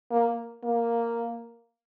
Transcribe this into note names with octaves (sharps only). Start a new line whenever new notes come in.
A#3
A#3